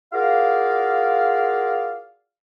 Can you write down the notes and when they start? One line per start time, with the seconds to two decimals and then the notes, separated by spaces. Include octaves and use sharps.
0.13 F4 F#4 G#4 A#4 D5 F5